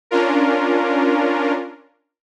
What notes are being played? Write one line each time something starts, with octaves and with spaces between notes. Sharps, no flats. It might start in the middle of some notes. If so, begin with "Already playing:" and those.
C#4 D4 F4 A#4